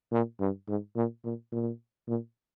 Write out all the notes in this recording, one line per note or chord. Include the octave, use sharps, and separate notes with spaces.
A#2
G2
G#2
A#2
A#2
A#2
A#2